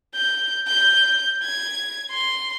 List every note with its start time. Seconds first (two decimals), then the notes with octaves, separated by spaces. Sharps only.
0.15 G6
0.68 G6
1.43 G#6
2.12 C6